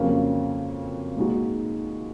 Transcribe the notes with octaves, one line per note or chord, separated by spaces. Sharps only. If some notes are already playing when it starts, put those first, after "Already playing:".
Already playing: F2 C#3 F#3 A#3 C#4
A#2 G#3 D#4 F#4